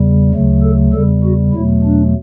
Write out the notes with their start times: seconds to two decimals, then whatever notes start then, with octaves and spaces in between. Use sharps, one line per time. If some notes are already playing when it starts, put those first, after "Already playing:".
Already playing: E2 C#3 G3
0.34 D2 C#3 F#3 A3
0.63 A4
0.93 E2 C#3 G3 A4
1.23 F#4
1.53 E2 B2 F#3 A3 E4
1.83 D4